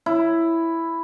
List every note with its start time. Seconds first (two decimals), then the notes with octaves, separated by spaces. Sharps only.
0.06 E4